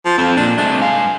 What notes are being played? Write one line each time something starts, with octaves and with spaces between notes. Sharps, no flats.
F3
F2 F3 C4
A#2 D4
C3 G#3 A3 D4
G2 G#3 F5